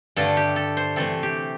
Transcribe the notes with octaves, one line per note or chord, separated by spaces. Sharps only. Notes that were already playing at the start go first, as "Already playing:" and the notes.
G2 D3 A3 A4
G4
A4
C5
C3 E3 A3 A4
G4